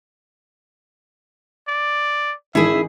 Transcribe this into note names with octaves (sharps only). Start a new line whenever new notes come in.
D5
A1 D#3 E4 G#4 E5